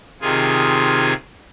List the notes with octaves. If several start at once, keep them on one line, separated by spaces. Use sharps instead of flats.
C3 D#3 F4 G#4